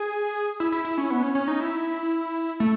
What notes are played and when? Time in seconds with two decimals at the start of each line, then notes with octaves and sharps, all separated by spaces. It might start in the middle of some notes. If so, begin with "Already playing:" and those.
Already playing: G#4
0.60 E4
0.72 E4
0.85 E4
0.98 C#4
1.10 B3
1.23 C#4
1.35 C#4
1.48 D#4
1.60 E4
2.60 A3